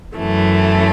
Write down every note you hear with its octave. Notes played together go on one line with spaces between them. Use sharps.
F#2 E3 A3